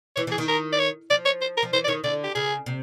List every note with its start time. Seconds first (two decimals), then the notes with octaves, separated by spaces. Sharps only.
0.16 E3 C#5
0.27 E3
0.32 G#4
0.38 D#3
0.48 A#4
0.73 D5
0.79 C#5
1.10 F3 D5
1.25 C#5
1.41 C5
1.57 A#4
1.63 F3
1.73 E3 C5
1.84 D5
1.88 D#3 C#5
2.04 D3 D5
2.24 G4
2.35 C#3 G#4
2.66 C3